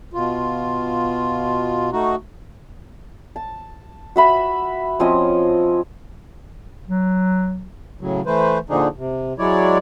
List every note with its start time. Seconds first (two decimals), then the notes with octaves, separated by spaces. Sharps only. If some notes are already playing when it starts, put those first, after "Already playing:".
0.13 B2 F4
1.92 A3 D#4 F#4
3.36 A5
4.16 F#4 E5 B5
5.00 F3 C4 C#4 D#5
6.87 F#3
8.01 A2 C#3 F#3
8.26 E3 A3 B4 C5
8.69 A#2 D3 F3 D4 D#4 G#4
8.97 C3
9.39 F#3 G#3 E4 C#5 D5